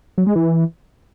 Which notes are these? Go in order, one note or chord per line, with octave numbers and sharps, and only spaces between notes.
F#3
G#3
E3